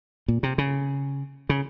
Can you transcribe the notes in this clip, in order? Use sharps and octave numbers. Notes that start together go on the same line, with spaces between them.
A#2
C3
C#3
C#3